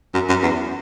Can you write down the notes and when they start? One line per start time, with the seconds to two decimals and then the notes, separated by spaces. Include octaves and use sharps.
0.14 F#2
0.29 F#2
0.43 E2